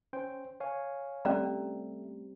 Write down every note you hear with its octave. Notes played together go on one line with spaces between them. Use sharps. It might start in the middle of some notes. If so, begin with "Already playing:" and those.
C#4 C5 G5
C#5 F5 G#5
G3 A3 C4 C#4 D5 A#5